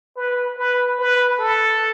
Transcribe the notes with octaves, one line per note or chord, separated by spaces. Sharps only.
B4
B4
B4
A4